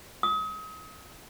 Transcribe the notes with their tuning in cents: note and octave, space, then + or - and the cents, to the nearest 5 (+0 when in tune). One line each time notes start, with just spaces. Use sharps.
D#6 +35